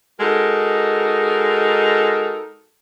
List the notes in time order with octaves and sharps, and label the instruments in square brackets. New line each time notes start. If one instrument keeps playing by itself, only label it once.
[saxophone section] G#3 D#4 F#4 A4 A#4